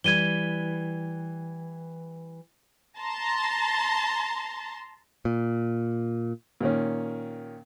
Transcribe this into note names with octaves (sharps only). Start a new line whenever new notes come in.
E3 G3 G#6 D#7 G7
A5 A#5 C6
A#2
A#2 D#3 C#4